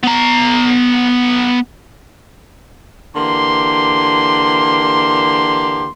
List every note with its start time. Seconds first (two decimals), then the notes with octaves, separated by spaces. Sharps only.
0.04 B3 A#5
3.15 D3 E3 A#3 G4 C6